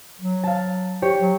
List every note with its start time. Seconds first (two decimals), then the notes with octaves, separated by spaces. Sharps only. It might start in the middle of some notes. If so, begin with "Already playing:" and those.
0.20 F#3
0.43 F5 A5
1.02 G4 C#5
1.20 F#3